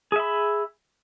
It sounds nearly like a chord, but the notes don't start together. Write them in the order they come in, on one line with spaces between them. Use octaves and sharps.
G#4 E5 B5